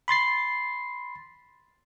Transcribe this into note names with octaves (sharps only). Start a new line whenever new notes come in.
B5 C6 A6 C7